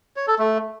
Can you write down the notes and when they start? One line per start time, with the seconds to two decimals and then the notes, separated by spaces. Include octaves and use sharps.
0.16 C#5
0.28 A4
0.39 A3